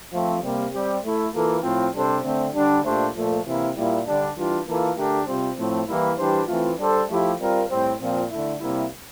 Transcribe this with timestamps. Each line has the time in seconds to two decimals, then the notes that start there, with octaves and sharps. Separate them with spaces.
0.12 F3 A3 C4
0.42 C3 G3 A#3
0.72 G3 C4 G4
1.02 A3 E4 A4
1.33 E3 A#3 F4 A4
1.63 A2 F3 C4 F4
1.94 C3 G3 D4 A4 C5
2.23 D3 A3 C4
2.54 D3 G3 D4
2.84 A#2 A3 D4 G4 C5
3.14 A#2 F3 A3
3.45 C3 E3 A#3 E4
3.75 A#2 G3 A#3 E4
4.06 D3 G3 D4
4.36 E3 G3 D4 F4
4.66 E3 A#3 F4 A4
4.97 D3 A3 D4 G4 A#4
5.27 C3 G3 C4 F4 C5
5.57 A2 F3 A3 C4
5.87 E3 G3 A#3 E4
6.18 E3 G3 D4 G4 C5
6.47 E3 A3 C4 F4
6.78 G3 D4 A4 C5
7.09 F3 A3 E4 G4
7.39 G3 C4 F4 A#4
7.69 A2 G3 C4
7.99 A#2 F3 C4 F4
8.30 D3 A3 E4
8.60 C3 G3 A#3 E4